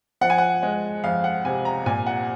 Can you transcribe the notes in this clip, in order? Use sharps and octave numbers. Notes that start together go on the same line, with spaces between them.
F3 F#5
G#5
F#5
G#3
F2 F5
F#5
C3 G#5
A#5
A#2 G#5
F#5